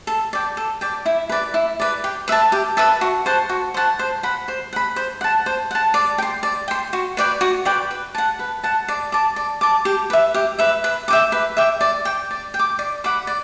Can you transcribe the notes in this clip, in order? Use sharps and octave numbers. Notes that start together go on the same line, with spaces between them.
A4
D5 G5
A4
D5 G5
E4
B4 D5
E4
B4 D5
G4
B4 E5 A5
G4
B4 E5 A5
F#4
C5 F#5 A5
F#4
C5 F#5 A5
C5
F#5 B5
C5
F#5 B5
C5
F#5 A5
C5
F#5 A5
D5
G5
C6
D5
G5 C6
F#4
B4 D5 G5
F#4
B4 D5 G5
B4
F#5 A5
B4
F#5 A5
D5
A5 D6
D5
A5 D6
G4
B4 E5
G4
B4 E5
B4
E5 G5 D6
B4
E5 G5 D6
D5
G5 D6
D5
G5
D6
D5
F#5 B5 D6
D5